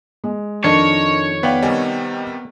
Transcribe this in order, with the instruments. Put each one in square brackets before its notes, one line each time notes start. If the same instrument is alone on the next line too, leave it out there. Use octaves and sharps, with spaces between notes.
[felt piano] G#3
[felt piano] F2 D#3 C#7 [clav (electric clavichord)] D4 [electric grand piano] A#4 D#5 [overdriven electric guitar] C#5
[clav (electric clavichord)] B3 D5 [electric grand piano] B4 F5 G5
[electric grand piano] C3 D#3 G3 [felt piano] D#5 G#5